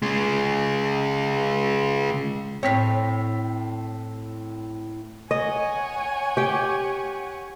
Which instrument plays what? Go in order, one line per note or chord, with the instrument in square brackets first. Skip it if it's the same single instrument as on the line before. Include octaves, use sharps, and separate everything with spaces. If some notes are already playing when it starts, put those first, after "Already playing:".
[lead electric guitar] C#3 G#3
[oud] A2 C#5 [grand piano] C4 B6
[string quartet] C#5 F#5 G#5 [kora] D#5
[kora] G4 G5